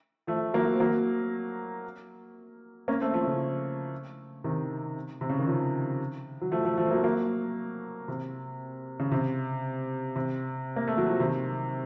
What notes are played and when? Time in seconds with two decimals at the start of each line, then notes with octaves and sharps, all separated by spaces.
0.27 F3 A3
0.54 F#3 A#3
0.74 C4
0.80 F#3 A#3
2.88 A#3 C#4
3.01 A3 C4
3.14 F3 A3
3.27 C#3 F3
4.44 C3 D#3
5.21 C3
5.29 C#3
5.39 D#3
5.48 C#3 F3
6.41 F#3
6.51 F3 A3
6.65 F3 A3
6.78 F3 A3
6.85 C4
6.90 F#3 A#3
7.04 F#3 A#3
8.08 C3
9.00 C#3
9.12 C3
10.16 C3
10.76 A#3
10.87 A3
10.97 F#3
11.09 F3
11.19 C3 D#3